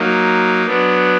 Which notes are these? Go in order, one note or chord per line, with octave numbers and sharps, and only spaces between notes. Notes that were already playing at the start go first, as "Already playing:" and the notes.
Already playing: F#3 A#3 D#4
F#3 B3 D4